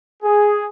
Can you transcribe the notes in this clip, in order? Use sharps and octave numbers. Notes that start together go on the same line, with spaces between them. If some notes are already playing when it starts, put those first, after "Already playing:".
G#4